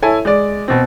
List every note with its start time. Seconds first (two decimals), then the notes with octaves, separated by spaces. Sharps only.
0.02 E4 A4 C#5 G#5
0.25 G#3 D5
0.68 B2 C4